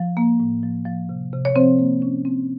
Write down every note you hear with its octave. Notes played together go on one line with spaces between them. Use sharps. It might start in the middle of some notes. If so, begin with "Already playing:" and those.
Already playing: F3
A#3
A2
F3
F3
C3
C3
C#5
F3 C4 C5
A#3
C#4
C4